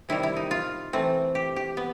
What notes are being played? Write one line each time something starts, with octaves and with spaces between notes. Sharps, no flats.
C3 D#3 G3 E4
E4
D#4
F4
E3 A3 C4
G4
G4
B3